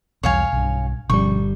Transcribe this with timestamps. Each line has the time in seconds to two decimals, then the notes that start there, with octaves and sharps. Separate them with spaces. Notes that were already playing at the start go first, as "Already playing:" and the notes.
0.23 B1 E2 G3 C#5 F5 G#5
0.53 B1 G2
1.10 G1 B2 F3 G3 C#4 C#6